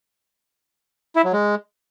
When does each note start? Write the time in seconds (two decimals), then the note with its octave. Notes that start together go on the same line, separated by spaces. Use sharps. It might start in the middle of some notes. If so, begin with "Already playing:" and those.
1.16 E4
1.24 F#3
1.33 G#3